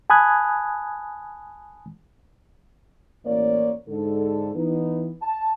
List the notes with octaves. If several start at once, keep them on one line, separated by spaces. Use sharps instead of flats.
G#5 A5 B5 D#6 F#6 G#6
A1 A#3 C#5 D5
G#2 D3 A4
E3 B3 D#4
A5